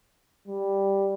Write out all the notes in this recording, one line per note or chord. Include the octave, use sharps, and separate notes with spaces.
G3